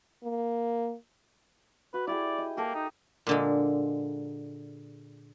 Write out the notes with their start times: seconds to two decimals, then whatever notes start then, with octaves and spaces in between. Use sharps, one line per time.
0.23 A#3
1.94 F#4 B4
2.07 E4 G4 G#4 D5
2.38 D#5
2.57 A#3 G4 A4 A#4
2.75 D#4
3.27 A#2 D3 G#3